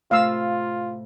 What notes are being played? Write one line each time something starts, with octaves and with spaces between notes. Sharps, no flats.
A2 C3 A3 F4 F5 E6